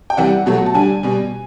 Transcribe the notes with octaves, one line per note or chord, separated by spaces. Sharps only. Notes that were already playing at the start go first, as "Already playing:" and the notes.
G5
C3 E3 G3 F#5
B2 F#3 A3
A5
D3 G3 G#5
B2 G3